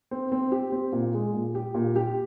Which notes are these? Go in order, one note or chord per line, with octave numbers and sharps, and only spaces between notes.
C4
C4
G4
C4
A#2
G#3
A#2
G4
A#2
G4